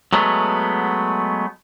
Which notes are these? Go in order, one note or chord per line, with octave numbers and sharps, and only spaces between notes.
F#3 G#3 A3 B3